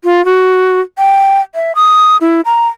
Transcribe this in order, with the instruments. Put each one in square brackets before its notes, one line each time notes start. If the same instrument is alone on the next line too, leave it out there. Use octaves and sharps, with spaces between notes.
[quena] F4
F#4
G5
E5
D#6
E4
A#5